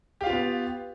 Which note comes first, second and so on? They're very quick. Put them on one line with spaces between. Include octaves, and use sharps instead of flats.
G4 F5 F4 B4 B3